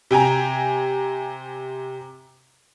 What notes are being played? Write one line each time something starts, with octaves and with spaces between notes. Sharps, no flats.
C3 G5 G#5 A#5